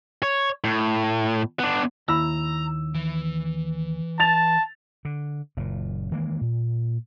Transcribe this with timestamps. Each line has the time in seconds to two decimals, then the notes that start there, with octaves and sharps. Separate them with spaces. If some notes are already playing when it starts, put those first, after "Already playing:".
0.23 C#5
0.64 A2
1.59 B3 D4
2.08 D#2 E4 A#5 B5 E6
2.95 E3
4.20 A5 A6 F7
5.05 D3
5.57 F#1 A#2
6.11 D#3 E3 G#3 A#3
6.41 A#2